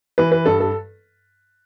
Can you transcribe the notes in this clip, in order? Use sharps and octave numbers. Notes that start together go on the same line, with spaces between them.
E3 B4
B4
G2 A4
A4